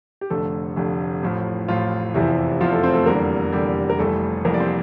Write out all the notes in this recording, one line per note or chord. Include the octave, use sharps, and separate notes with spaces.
G4
F1 F2 D3 A3 A4
F1 F2 D3
A1 A2 F3
A1 A2 F3 F4
F1 E2 C3 E3 F3 E4
F1 E2 C3 F3 F4
A3 A4
C4 C5
A3 A4
F1 E2 D3 G3 A#3 A#4
F1 E2 D3 G3 G4
A#4
F1 F2 E3 G3 A3 A4
F1 F2 E3 G3 A#3 A#4
D5
C4 C5